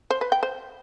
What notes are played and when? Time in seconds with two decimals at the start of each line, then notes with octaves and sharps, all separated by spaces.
0.10 C5
0.21 B4
0.32 G5
0.43 C5